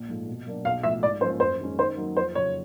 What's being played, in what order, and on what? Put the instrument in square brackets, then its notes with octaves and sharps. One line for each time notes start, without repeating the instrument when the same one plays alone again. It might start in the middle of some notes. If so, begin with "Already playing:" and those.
Already playing: [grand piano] A#1
G#2 F3 A3
B2
F#3 A#3 D4
[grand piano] B1 [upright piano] F5
[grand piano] A2 F3 [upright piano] E5
[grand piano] G#2 [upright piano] D5
[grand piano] F3 A#3 C#4 [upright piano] C5
[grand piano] F#2 [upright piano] C5
[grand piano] D#3 G#3 C#4
[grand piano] D#3 [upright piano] C5
[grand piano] F#3 A#3 D#4
[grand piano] F2 [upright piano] C5
[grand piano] C#3 F#3 [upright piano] C#5